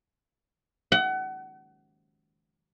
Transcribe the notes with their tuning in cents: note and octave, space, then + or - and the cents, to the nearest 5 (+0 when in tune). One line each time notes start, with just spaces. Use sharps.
F#5 +30